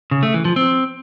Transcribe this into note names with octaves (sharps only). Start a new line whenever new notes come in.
C#3
A3
E3
F3
C4